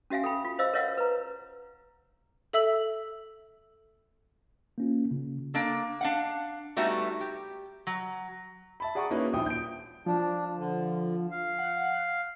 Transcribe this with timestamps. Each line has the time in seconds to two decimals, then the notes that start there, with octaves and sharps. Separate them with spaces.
0.10 C#4 F#4 E5 F5 G#5
0.24 A4 G5 B5
0.45 F4
0.59 C5 D#5 F5 E6
0.74 A#4 C#5 D#5 F5 F#5
0.97 B4 A#5
2.53 A4 E5 E6 F#7
4.78 A#3 C#4 F4
5.11 C#3
5.54 A#3 D4 A4
6.01 D4 F5 F#5
6.77 G3 A3 B3 D#4 F#4 E5
7.21 G4
7.87 F#3
8.80 E5 A5 B5
8.95 G#4 D5 F#5 A#5 C#6 D#6
9.11 A#3 C#4 D#4 E4 F#4 B4
9.33 D#1 A#1 F3 E5 G5 D#6
9.46 G6 D7
10.06 F3 D4
10.57 D3
11.31 F5
11.59 F#5